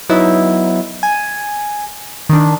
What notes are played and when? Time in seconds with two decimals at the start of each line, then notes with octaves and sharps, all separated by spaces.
0.09 F#3 B3 D#4 E4
1.03 G#5
2.29 D#3 D4